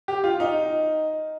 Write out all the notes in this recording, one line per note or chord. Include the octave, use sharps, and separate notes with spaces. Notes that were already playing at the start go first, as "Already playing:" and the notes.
G4
F4
D#4